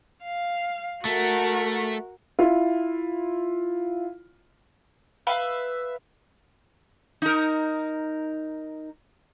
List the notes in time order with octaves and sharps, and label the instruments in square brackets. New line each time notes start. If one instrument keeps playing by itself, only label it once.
[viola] F5
[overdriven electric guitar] A3 [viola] F#4 A#4
[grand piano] E4 F4
[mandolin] B4 E5 F5 B5
[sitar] D#4 A#4